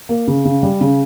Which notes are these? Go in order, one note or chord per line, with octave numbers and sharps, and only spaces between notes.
A#3
C#3
C#3
G3
C#3